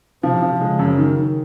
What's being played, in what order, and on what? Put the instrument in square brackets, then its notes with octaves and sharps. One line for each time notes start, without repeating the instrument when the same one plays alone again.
[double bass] C3 [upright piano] F3
[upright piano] F3
[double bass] C#3 [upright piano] G#3
[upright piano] F#2
D#3
D#3